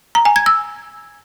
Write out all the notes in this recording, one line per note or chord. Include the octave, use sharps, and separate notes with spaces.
A#5
G#5
G#6
E6